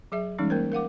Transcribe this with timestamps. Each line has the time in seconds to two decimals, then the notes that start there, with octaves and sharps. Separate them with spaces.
0.12 F#3 G#4 E5
0.38 E3 G3 G#3 C#4 D#4
0.50 A#3 A#4 C5
0.72 A#4 F5 F#5 D6